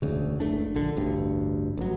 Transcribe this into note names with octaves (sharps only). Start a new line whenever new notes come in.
E1 D2 C#3
F#1 C#2 A3 D4
A#1 D3
A1 D2 G2
A1 F#3